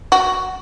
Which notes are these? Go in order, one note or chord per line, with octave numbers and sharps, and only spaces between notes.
F#4